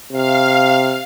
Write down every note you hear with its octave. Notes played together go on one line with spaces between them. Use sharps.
C3 F5